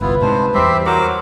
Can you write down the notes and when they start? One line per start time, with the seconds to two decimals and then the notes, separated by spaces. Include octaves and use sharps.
0.01 G1 C2 B3 E4 F4 B4
0.21 G#2 C3 D4 C5
0.54 E2 G3 C4 G4 E5
0.86 F#3 A#4 C5 D6